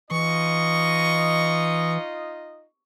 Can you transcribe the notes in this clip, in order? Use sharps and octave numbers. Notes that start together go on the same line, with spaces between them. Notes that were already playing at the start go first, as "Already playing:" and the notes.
E3 D#4 F4 D#5 C#6